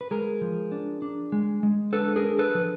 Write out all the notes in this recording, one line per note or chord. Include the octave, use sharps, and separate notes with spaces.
B4
G#3 G#4 A#4
F3
D4
D4
G#3
G#3
D4 A4 B4
G#4 A#4
D4
A4 B4
F3